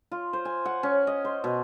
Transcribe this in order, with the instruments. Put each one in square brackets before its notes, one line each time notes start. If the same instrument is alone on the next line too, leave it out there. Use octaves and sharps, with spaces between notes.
[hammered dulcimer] F4
C5
G#5
F#5
C#4
D#5
C5
B2